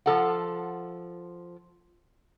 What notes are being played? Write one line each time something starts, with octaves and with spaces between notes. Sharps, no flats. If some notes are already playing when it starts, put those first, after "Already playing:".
F3 A4 F#5